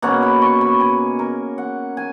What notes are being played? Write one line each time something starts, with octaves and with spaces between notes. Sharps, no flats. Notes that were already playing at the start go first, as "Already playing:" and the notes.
B2 A#3 C#4 F#5
B5
C#6
B5
G#5
A#4
F#5
G#5